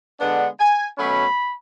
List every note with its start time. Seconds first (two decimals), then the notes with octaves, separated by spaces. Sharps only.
0.19 D3 G#3 B3 D4 F#5
0.59 G#5
0.98 B2 F#3 A3 C#4 B5